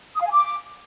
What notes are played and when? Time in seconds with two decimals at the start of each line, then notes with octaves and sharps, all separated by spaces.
0.16 D#6
0.21 F5
0.27 G#5
0.32 D6